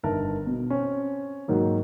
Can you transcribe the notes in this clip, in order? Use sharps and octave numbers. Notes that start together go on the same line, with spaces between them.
G1 D#3 A#4 E5 A5
B2
C4 C#4
G#2 D#3 F#3 A#3